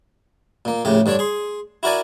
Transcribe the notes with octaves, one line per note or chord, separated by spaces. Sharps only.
A#2 A#3
A#1 A2 C#3 G4
G2 D3 D4 C#5
G#4 C6
E4 F#4 A#4 D5 G#5